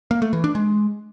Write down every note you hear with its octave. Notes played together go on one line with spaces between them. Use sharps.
A#3
A3
E3
D4
G#3